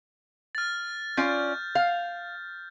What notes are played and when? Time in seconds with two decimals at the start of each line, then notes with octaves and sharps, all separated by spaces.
0.55 F6 A6
1.17 C#4 F4 D5 G6
1.75 F5